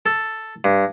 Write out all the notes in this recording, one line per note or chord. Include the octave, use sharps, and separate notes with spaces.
A4
G2